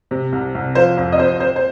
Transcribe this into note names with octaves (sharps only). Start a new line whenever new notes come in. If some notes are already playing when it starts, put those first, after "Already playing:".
C3
C2
C2
F3 C5
F2
D#5
F2 C5
C4 C5
C5